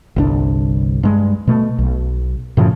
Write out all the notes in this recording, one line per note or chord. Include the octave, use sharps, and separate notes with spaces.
G1 C2 D4
G2 G#3
B2 A3
B1
F#2 A2 C#3 F3